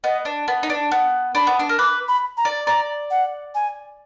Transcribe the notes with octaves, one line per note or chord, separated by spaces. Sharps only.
B3 D#5
D4
B3
D#4
D4
B3
D4 B5
B3
D4
A#4
B4 D6
B5
A#5
D5
D5 A#5
F#5
G#5